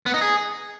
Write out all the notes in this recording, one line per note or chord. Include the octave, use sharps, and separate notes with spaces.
B3
D#4
G#4